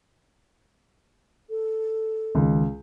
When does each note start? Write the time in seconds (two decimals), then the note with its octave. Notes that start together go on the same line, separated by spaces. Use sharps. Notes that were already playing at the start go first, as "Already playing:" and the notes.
1.50 A4
2.35 C#2 D#3